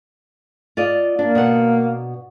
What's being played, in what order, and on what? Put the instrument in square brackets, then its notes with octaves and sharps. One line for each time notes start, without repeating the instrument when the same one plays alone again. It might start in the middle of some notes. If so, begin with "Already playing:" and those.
[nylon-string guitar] F4 D5 D#5
[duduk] A#3 [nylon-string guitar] D4
[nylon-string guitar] B2 B3 F#5